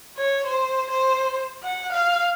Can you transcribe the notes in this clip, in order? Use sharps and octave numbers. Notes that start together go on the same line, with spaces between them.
C#5
C5
C5
F#5
F5